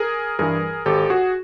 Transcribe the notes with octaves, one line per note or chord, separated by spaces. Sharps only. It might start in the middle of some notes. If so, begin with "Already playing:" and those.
Already playing: G#4 A#4
G2 E3 G#4 A#4
G#1 G4 A4
F#4 G#4